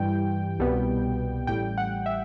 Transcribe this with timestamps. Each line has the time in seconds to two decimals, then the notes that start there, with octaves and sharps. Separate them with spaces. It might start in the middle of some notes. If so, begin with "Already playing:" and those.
Already playing: G2 E3 G3 G5
0.59 C2 B2 G3 B3
1.47 A1 A2 G3 G5
1.78 F#5
2.06 E5